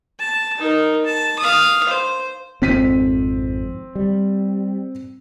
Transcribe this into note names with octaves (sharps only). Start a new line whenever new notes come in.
A5
D#4 A#4
A5
F5 D#6
C5
G#1 F2 C4 B6 D#7
G3